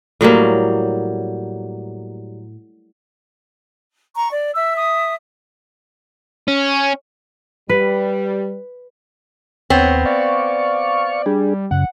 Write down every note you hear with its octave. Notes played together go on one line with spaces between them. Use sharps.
A2 F#3 G3 A#3
A#5 C#6
D5
E5 E6
D#6
C#4
G3 B4
D#2 B3 C4 C#5
D5 F5 C#6
G3 D4 G#4
F#2 C#3 F#5